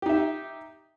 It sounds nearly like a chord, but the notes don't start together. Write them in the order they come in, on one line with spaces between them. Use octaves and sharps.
G4 D#4 E5